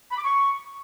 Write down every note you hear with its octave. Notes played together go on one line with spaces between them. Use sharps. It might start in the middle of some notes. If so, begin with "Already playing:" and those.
B5
D6
C#6